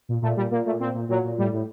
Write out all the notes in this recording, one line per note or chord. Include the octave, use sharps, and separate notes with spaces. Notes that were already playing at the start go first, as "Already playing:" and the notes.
A#2
A#2 A3
A#2 G3
A#2 A#3
A#2 A3
A#2 C4
A#2
A#2 F#3
A#2
A2 G3
A2